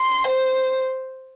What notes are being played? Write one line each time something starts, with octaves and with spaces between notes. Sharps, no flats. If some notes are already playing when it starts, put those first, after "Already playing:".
Already playing: C6
C5